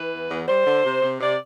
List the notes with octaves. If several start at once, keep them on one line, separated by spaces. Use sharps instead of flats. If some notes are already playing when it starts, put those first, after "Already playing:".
Already playing: E3 B4
E2
E2
G3 C5
D3
C3
C3
C3 D5